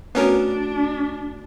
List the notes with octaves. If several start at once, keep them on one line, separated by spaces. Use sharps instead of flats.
A3 B3 C#4 D4 F#4 A#4